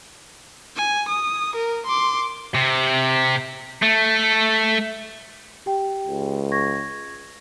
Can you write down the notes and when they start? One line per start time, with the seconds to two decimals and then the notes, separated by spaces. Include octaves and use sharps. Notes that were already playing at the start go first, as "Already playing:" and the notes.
0.76 G#5
1.08 D#6
1.56 A#4
1.86 C6 D6
2.55 C3
3.82 A3
5.66 G4 G5
6.07 C#2
6.52 C#6 G#6 A#6